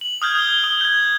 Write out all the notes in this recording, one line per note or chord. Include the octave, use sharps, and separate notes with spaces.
F#7
D#6 F6 G6 G#6
D#6 G7
D#6 G7
G6 G#6